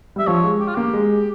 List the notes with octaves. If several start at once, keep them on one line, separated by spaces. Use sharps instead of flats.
G3 E5
F3 C#5
G#3
G4
F4
A#3 G4
G#3